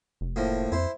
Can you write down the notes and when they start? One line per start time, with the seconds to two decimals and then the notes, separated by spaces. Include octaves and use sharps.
0.21 F1
0.36 A2 F3 A#3
0.72 F2 E4 C5